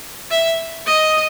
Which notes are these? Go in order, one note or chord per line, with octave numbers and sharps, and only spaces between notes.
E5
D#5